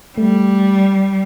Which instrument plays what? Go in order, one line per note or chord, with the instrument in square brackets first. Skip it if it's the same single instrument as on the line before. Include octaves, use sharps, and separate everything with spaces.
[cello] G3 [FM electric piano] A3